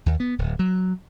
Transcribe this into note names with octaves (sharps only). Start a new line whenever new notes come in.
D#2
B3
D1
F#3